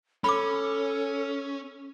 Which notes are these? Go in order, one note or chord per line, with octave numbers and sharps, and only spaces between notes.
C#4 A4 B5 D6